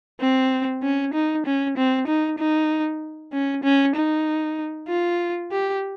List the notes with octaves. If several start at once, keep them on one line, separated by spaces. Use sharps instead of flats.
C4
C#4
D#4
C#4
C4
D#4
D#4
C#4
C#4
D#4
F4
G4